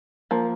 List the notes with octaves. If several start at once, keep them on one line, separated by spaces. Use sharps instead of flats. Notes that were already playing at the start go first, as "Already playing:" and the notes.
F3 A#3